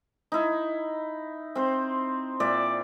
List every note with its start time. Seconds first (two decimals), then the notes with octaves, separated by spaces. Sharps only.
0.32 D#4 E4
1.55 C4 C5
2.40 A#2 D5 E5